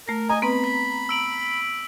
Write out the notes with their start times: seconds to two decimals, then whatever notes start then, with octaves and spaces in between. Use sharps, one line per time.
0.08 A3 A#4 A#6
0.29 D#5 G#5 A#5
0.42 B3 C4 B4 B5
0.64 B6
1.09 E6 D7 F#7